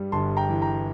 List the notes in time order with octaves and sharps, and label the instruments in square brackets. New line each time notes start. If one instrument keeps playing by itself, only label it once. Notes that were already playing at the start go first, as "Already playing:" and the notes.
Already playing: [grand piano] G2 G3
G1 A5 C6
G5 A#5
E3
G5 A#5